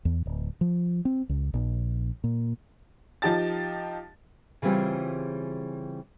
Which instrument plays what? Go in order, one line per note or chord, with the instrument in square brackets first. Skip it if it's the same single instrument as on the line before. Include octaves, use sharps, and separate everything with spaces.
[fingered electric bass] E2
D1
F3
C4
C#2
A#1
A#2
[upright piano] F3 D#4 G4 A5 A6
[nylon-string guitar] C#3 E3 G3 C4 F4 G#4